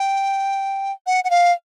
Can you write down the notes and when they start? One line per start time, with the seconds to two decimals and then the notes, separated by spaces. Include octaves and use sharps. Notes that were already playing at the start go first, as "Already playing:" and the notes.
Already playing: G5
1.07 F#5
1.24 F#5
1.30 F5